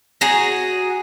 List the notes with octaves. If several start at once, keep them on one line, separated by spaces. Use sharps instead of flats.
F#4 G#4 A#5